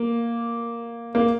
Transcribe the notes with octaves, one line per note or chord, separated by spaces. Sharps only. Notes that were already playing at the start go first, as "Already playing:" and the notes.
Already playing: A#3
A#3